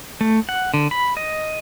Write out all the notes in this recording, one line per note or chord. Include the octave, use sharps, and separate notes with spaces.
A3
F#5
D3
B5
D#5